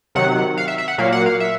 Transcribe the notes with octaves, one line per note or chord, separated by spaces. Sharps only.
C3 D#3 F#3 F#5
F5
E5
E5
F#5
A#2 F#3 A#3 F5
F#5
F5
E5